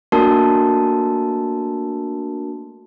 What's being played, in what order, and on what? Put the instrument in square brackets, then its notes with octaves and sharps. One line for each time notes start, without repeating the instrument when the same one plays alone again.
[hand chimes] A3 A#3 D4 F#4 A#4 A5